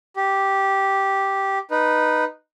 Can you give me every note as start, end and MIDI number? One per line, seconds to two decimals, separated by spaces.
0.16 1.59 67
1.71 2.24 63
1.71 2.24 71